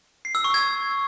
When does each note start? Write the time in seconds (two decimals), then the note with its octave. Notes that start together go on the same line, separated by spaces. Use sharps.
0.25 C7
0.35 E6
0.44 C#6
0.54 G#6